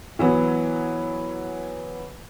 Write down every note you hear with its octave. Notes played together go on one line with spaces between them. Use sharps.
E3 F#3 B3